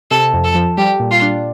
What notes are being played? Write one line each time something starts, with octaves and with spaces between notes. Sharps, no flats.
C3 A4
F2
A4
F3
G3 G4
A#2
F4
D4